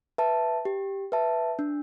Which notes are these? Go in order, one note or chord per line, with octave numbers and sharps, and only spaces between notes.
B4 E5 A5
G4
B4 E5 A5
D4